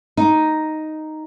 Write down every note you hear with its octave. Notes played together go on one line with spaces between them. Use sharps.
D#4